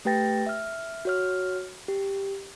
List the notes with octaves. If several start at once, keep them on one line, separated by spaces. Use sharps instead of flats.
A3 G4 B4 G5 A6 A#6
E5 F6
F#4 C#5 F6
G4